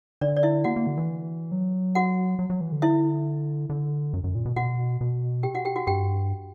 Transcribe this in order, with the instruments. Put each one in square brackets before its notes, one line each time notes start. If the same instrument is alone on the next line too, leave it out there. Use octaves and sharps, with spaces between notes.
[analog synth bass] D3 [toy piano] D4 D5
[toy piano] D5
E4 E5
[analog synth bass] A#3 [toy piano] F#4 F#5
[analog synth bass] A#3
D3
E3
F#3
[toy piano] F#4 F#5
[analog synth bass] F#3
F#3
E3
D3
[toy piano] E4 E5
[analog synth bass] D3
F#2
F#2
A#2
B2
[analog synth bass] B2 [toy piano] F#4 F#5
[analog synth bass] B2
[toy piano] G4 G5
F#4 F#5
G4 G5
F#4 F#5
[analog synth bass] G2 [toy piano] G4 G5